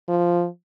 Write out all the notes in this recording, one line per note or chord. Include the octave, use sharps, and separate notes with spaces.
F3